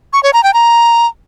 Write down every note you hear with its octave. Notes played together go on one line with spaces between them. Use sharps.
C#6
C#5
A#5
G5
A#5